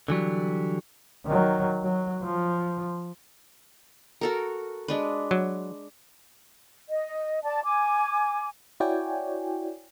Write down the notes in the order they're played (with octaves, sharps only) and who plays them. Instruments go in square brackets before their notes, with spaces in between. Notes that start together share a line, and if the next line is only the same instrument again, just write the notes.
[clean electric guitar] D3 E3 F#3 G3
[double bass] D#3 F#3
F#3
F3
[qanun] F#4 A4 A#4
G#3 D4 B4
[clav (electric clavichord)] F#3
[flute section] D#5
D5 A5
G#5 D6
[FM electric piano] E4 F#4 C#5 D5 G5 G#5